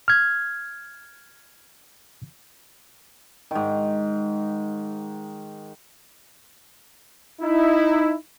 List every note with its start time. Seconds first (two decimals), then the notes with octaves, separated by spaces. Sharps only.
0.08 F6 G#6
3.51 G#2 D#3
7.42 D#4 E4